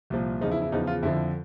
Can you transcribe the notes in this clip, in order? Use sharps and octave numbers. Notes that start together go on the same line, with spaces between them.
C2 A#2 F3
E2 C#3 F3 D#4
E4
E4
E2 C#3 F3 D#4
F4
F2 D3 F3 E4